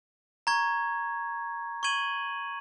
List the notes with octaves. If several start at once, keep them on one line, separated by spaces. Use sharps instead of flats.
A#5 C#6 G#6
C#6 G#6 D#7 F#7